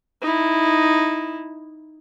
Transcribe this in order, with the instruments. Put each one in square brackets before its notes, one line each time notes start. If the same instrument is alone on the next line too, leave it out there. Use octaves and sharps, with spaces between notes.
[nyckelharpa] D#4 E4